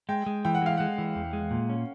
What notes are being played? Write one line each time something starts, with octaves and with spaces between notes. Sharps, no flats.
G#3 G5
G#3
E3 G5
F#5
G#3 F5
G#3 F#5
E3
E2
G#3
A#2
C#4